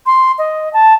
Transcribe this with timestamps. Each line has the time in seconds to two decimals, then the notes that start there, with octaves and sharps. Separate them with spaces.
0.06 C6
0.38 D#5
0.73 A5